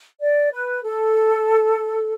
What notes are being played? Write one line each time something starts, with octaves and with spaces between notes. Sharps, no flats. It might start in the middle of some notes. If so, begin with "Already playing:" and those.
D5
B4
A4